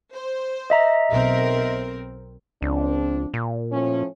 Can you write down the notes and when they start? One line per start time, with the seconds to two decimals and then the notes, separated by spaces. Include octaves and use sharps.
0.12 C5
0.70 D#5 E5 A#5
1.11 B1 C4 A#4
2.62 C#2 F3 C4 D4
3.34 A#2
3.71 A2 F3 C#4